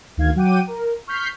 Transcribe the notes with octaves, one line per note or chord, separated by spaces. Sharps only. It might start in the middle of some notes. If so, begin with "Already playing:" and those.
D2 D#3 F5 G#6
F#3 F#5 G5 D6 D#7
A#4
C#6 F6 G6 B6 C7